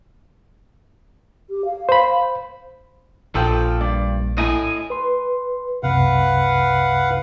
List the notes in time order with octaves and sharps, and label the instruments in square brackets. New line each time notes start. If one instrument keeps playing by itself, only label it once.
[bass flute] G4
F5
[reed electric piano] C5 B5
[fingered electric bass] A#1 [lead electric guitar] A#2 F3 [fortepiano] A4 G5
[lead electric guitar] G2 [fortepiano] D5
[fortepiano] A2 [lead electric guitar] D#5 G#5
[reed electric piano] B4 C6
[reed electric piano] C2 F#2 C3 [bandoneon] B4 F5 F#5